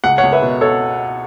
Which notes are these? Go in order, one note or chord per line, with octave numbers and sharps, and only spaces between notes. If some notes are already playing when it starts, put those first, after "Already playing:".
C#2 F#5
C#5 F#5
C#2
B4 E5
B2
A4 C#5